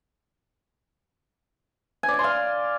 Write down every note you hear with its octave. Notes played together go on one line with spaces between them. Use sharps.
G#5
D5
G#5
C6
F5